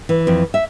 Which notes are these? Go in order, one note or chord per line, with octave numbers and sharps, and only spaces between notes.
E3
F2
E5